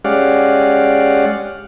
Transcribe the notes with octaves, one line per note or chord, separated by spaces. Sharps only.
G#3 C#4 G4 D5 F5 F#5